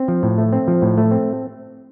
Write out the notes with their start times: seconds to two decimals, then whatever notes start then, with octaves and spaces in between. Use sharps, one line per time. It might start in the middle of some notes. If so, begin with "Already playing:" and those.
Already playing: C4
0.08 F3
0.23 A2
0.38 A3
0.52 C4
0.68 F3
0.82 A2
0.98 A3
1.11 C4